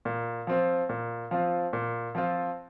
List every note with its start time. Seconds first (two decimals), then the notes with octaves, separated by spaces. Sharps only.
0.05 A#2
0.47 F3 C4 F4
0.89 A#2
1.31 F3 C4 F4
1.73 A#2
2.15 F3 C4 F4